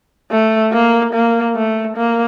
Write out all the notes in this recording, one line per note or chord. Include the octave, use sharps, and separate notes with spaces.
A3
A#3
A#3
A3
A#3